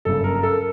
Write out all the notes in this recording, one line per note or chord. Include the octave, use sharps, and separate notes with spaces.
G1 F#2 C#3 A4
A#4
A#4
A4